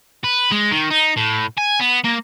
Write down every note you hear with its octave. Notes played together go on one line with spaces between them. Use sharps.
B4
G#3
D#3
D#4
A2
G#5
B3
A#3